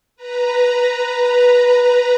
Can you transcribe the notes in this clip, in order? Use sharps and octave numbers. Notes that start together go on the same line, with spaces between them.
B4 A#5